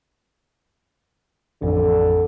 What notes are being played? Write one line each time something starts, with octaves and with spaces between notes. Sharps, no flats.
A1 F2 D3